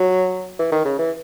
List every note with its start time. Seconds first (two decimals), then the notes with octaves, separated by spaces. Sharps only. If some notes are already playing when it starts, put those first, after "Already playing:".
Already playing: F#3
0.59 E3
0.72 D#3
0.85 C#3
0.99 E3